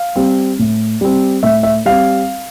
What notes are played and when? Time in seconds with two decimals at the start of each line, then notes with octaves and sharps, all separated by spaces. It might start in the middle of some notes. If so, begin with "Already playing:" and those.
Already playing: F5
0.16 G3 C4
0.59 A2
1.01 G3 C4
1.43 A2 E5
1.63 E5
1.86 G3 C4 F5